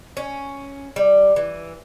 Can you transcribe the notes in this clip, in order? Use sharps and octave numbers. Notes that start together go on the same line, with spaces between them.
C#4
G3
E3